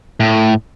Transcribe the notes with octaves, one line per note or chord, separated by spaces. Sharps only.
A2